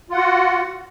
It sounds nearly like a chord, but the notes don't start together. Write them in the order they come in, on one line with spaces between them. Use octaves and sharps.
F4 F#5 F#4